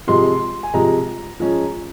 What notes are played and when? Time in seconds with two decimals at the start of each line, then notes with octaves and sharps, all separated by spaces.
0.07 C3 F3 G#3 C6
0.63 G#5
0.73 C3 F3 G#3 A#5
1.40 F3 G#3 C#4